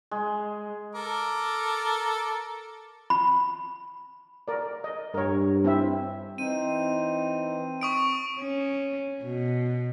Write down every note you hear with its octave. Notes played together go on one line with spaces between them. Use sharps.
G#3
A4 A#4 D6
B5
A#4 D5
D#5
G2 A#4 C#5
C4 E4 E5
E3 C4 D#4 D#7
C#6 D#6 D7
C#4
B2